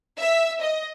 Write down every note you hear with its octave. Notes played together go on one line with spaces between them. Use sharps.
E5
D#5